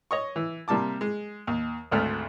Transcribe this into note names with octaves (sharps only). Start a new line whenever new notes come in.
C#5 D#5 C#6
E3
C3 G3 A#3 A5 D6
G#3
D#2
G#1 D2 G#2 A3 F6